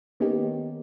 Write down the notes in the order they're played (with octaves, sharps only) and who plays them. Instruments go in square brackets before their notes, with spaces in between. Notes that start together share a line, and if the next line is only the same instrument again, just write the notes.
[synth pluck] D#3 A#3 B3 C#4 D#4 G4